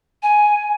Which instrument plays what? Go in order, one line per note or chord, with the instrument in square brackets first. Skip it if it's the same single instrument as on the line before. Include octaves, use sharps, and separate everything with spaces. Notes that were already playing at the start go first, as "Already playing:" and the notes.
[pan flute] G#5